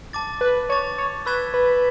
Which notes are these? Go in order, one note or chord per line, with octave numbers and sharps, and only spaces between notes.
A5 D6 A6
B4
C#5 A5 D6 A6
C#5
B4 C#6 E6 G#6 B6 E7
B4